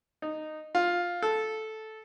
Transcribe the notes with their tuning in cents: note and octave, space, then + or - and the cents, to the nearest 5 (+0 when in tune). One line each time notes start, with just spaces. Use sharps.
D#4 -10
F4 +10
A4 -10